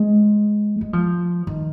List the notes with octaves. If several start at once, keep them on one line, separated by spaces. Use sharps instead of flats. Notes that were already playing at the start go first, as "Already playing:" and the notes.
Already playing: G#3
G#3
F3
D#3